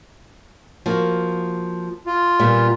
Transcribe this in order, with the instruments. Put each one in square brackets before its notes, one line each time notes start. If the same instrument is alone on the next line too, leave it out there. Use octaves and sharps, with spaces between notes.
[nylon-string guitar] F3 A#3 F#4
[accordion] F4
[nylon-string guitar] A#2 G3 B3